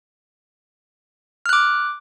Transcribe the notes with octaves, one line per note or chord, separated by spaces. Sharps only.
D6 F6 F#6